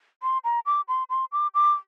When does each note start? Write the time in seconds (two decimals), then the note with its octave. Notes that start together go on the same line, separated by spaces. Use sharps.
0.23 C6
0.44 A#5
0.66 D6
0.88 C6
1.10 C6
1.32 D6
1.54 D6